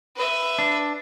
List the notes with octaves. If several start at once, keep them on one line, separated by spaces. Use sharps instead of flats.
B4 E5
D4